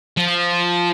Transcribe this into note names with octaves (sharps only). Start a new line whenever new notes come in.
F3